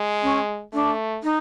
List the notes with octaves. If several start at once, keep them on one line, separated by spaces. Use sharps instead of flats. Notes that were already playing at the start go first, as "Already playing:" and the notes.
Already playing: G#3
C#4
A3 D4
D#4